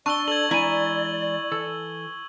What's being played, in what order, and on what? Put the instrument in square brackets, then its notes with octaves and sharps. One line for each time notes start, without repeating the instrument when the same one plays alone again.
[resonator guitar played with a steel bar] D4 [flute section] D5 [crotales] C#6 E6 G7
[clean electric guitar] A4 [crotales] G#6 F#7
[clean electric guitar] E3 G#3 G#5 [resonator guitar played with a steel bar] E4 A#5
[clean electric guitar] E3 A4